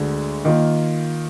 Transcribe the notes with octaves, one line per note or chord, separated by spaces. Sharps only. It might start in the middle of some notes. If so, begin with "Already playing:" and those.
Already playing: D2 D3 G#3
D#3 A#3 F4